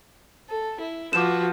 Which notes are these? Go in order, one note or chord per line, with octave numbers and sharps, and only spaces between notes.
A4
E4
F3 F#4 B4 D6 E7